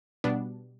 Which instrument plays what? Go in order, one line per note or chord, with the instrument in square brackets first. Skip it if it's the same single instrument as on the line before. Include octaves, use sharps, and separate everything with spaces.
[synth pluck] B2 G3 B3 D4